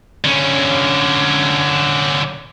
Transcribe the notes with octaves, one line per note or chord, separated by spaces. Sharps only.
D3 C#4